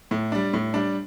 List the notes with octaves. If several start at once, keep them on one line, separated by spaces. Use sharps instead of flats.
A2
G3 D4
A2
G3 D4